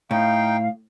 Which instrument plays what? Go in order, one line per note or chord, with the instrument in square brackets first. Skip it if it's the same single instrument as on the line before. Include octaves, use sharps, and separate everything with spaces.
[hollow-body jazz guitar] A2 [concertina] D#4 G5 [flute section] F5